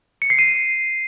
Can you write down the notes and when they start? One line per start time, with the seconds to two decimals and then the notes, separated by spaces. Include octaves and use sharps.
0.22 C#7
0.30 C7
0.39 D#7